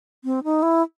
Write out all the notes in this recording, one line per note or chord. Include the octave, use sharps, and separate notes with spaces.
C4
D#4
E4